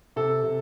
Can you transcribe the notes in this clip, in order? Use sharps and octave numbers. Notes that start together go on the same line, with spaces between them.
C3 A4
C3